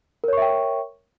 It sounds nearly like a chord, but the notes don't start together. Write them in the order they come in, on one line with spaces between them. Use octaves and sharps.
A#4 C#5 C#6 E5 G5